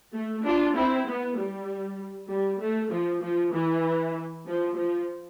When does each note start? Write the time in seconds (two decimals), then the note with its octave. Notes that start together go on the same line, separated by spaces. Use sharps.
0.14 A3
0.44 D4 F4
0.76 C4 E4
1.07 B3
1.38 G3
2.30 G3
2.60 A3
2.92 F3
3.23 F3
3.53 E3
4.46 F3
4.76 F3